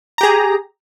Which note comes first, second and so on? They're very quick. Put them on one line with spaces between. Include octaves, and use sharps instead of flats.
A#5 G4 G#4